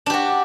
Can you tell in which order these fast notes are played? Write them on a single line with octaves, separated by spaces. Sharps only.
D4 G4 F#4